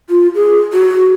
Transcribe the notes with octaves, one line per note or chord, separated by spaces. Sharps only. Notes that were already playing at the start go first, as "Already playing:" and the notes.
F4
G#4
F#4